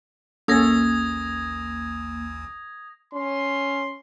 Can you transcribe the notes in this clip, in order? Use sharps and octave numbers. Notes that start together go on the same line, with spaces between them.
A1 D#2 A#3 C#4 A4 D#6 G#6 A#6
C#4 C6